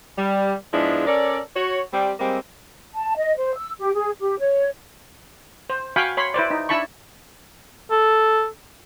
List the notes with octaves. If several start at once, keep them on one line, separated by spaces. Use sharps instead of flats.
G3
G#2 F3 G#3 B3 D4 E4
C#4 A4 A#4 C#5 D5
F#4 C#5
G3 C4
G3 G#3 A#3 C4
A5
D#5
C5
E6
G4
G#4
G4
C#5
C5
F#4 F5 G5 G#5 B5 C#6
C#5 B5 C6
E4 B4 C5 D5
D#4
D4 E4 A5 B5 C#6
A4